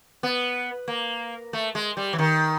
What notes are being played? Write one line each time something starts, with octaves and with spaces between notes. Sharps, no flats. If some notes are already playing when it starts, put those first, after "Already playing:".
B3
A#3
A3
G#3
G3
E3
D#3